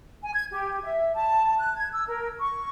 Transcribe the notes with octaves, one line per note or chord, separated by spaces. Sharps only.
G#5
G#6
G4
E5
A5
F#6
G#6
E6
A#4
C#6